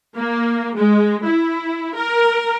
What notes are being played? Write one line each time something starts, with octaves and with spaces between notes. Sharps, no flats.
A#3
G#3
E4
A#4